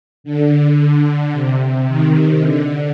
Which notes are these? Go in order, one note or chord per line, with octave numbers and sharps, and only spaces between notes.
D3
C3
D#3
D3